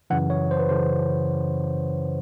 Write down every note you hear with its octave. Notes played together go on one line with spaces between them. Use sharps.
F#2 C#3 E3 F#5
C#5
C5
B4
F#2 C#3 E3 C5